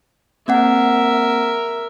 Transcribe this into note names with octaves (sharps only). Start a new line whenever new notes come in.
A#3 C4 A#4 E5 F#5